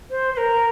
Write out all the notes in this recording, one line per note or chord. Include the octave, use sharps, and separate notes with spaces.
C5
C5
A#4